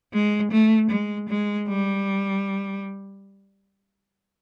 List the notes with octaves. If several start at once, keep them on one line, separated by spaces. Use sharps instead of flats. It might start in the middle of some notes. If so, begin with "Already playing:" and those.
G#3
A3
G#3
G#3
G3